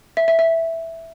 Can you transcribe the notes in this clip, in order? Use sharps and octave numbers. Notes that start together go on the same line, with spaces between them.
E5
E5
E5